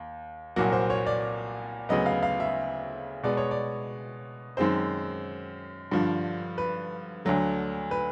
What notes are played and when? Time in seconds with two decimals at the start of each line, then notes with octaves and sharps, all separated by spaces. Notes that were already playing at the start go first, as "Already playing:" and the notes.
Already playing: D#2
0.56 C2 A#2 F#3 A#3 F#4
0.73 C5
0.90 C#5
1.07 D5
1.89 D2 C#3 F#3 B3 D#5
2.06 F5
2.23 F5
2.40 E5
3.23 B2 G#3 B3 D5
3.37 C#5
3.51 D5
4.57 F#2 D#3 G#3 C4 C5
5.92 G2 D3 F3
6.58 B4
7.25 D2 D3 F#3 A3
7.91 B4